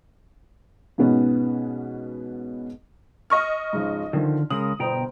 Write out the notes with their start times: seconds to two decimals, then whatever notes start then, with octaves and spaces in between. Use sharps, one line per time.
0.98 G#2 B2 B3 C#4 D#4
3.30 D#5 C#6 F6
3.73 G#2 C#3 F3
4.13 D3 D#3 F3
4.50 C#3 G#3 A#4 D#6 F#7
4.80 G1 B2 C5 G5 A#5